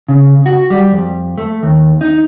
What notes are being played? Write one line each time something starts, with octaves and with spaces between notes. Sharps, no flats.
C#3
F#4
G3
F2
A3
D#2
D#4